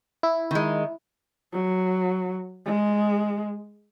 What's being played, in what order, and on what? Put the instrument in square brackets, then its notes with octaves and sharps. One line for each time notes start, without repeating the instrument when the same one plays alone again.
[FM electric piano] E4
[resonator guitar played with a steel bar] D#3 G#3
[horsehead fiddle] F#3
G#3